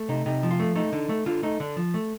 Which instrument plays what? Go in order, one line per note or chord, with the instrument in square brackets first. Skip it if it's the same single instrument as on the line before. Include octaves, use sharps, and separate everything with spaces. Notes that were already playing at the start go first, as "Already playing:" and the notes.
Already playing: [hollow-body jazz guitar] A3
C3 D#4
C3 D#4
F3
F4
A3
A3 D#4
D3
A3
D3 F4
A3 D#4
D3 D4
F3
A3